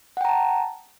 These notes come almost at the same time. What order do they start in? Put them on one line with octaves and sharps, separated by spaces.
F#5 G5 A#5 A5